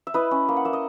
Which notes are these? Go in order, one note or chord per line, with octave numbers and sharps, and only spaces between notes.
E5
E4 B4 D#5
C#4
A#3
F#5
A#3 E5
D#5